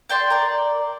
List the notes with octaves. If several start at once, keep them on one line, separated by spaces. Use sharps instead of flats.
D5 G5 A5 C6
A#4 D5